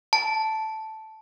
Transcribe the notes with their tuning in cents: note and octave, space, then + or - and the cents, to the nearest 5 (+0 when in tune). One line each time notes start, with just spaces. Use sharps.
A5 -5